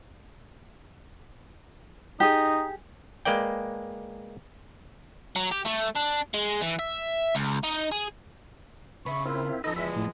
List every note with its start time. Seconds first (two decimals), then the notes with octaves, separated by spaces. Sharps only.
2.20 D#4 G4 G#4
3.25 G#3 A#3 B4 D5 G5
5.36 F#3
5.52 G4
5.66 A3
5.96 D4
6.34 G#3
6.62 E3
6.79 E5
7.35 C#2
7.63 D#4
7.92 G#4
9.06 C#3 E5 B5 C#6
9.25 A#3 C4 E4 F4
9.64 F3 D#4 A4 B4 D#5
9.76 E2 G#3 E5
9.96 A2